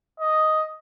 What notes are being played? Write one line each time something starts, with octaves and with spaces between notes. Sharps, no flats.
D#5